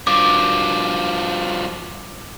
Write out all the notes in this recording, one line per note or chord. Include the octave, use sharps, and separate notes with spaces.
G2 F3 D6